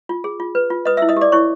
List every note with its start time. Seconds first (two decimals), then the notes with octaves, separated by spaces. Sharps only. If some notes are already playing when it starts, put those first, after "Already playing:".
0.09 F4
0.24 G#4
0.40 F4
0.55 B4
0.70 F4
0.85 B4 D#5 D#6
0.97 E5 E6
1.02 E4
1.09 D#5 D#6
1.17 G4 D5 D6
1.32 E4 C#5 C#6